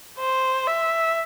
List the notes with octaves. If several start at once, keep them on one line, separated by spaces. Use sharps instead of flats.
C5
E5